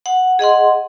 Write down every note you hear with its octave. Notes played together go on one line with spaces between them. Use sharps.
F#5
G#4 D#5 F#5 C6